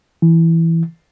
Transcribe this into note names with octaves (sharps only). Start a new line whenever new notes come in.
E3